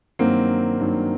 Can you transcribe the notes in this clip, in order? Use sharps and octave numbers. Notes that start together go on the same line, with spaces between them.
G2 D#3 F#3 A#3 C4
G2 D#3 F#3